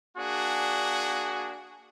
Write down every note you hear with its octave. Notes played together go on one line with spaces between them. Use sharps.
A#3 D4 F#4 G#4